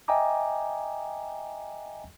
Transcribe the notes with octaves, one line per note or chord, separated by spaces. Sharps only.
D#5 E5 G5 G#5 A#5 D6